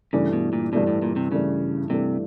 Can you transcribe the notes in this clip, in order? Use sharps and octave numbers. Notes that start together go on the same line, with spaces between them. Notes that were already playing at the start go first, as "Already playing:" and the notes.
G2 C#3 E3 A3 D4
B2
A#2
G2 B2 E3 A3 D4
A2
A#2
C3
G2 C#3 E3 A3 D4
G2 C3 E3 A3 D4